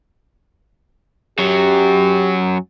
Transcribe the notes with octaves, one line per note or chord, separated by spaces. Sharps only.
F#2 F#3 G4